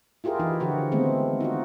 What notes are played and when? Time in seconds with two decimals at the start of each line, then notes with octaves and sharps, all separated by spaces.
0.24 E4 F4 G4 G#4 A#4
0.39 E3 D#4 E4
0.60 D3 F3 F#4 G4
0.92 D#3 G#3 A3 B3 C4
1.41 D#4 F4 F#4